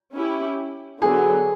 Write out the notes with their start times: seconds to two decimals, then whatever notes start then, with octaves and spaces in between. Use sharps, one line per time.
0.13 C#4 E4 G4
1.02 D3 F#3 B3 G#4